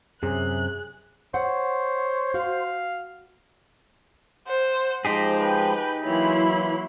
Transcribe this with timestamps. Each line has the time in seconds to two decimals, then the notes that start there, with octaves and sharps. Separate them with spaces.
0.23 F#2 C3 G#4 F#6
1.34 C5 C#5 F#5
2.34 F#4 F5
4.47 C5 F#5
5.05 F3 G#3 D#4 G4 G#4 C5
5.40 B4 G5
6.05 E3 F#3 A#3 E4 C#5 B5 C6